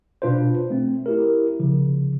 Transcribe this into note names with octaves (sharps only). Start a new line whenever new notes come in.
B2 D4 F4 B4 C5
A3 C4
E4 G4 A#4
C#3 F3